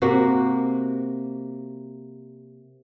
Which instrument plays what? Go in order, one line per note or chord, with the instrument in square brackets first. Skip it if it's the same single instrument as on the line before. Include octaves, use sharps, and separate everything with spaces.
[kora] C3 A#3 F#4